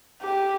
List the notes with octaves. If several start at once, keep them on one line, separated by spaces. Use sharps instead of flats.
G4